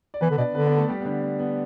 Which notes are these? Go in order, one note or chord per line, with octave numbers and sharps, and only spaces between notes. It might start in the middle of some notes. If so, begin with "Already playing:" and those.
D5
E3 B3 B4
D3
B2 D4 D5
D3 B3 B4
B3 B4
A3 A4
G3 G4
B3
D3 D4
B3
B3